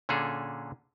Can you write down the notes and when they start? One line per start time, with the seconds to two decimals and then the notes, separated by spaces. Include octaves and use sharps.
0.09 A#2 D3 C#4 G#4 A4